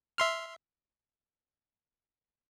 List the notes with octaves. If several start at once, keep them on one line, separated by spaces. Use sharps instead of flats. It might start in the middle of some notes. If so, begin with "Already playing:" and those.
E5 C6 F6